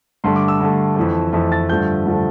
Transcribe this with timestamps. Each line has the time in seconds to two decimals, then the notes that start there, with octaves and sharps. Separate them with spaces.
0.24 G2 D3 A3 C6
0.36 D6
0.48 E6
0.60 G2 D3 A3
0.96 F2 E3 A3
1.33 F2 E3 A3
1.52 A6
1.69 G2 D3 F3 A3 G6
2.06 G2 D3 F3 A3